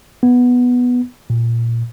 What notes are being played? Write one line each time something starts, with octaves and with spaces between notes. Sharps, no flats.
B3
A#2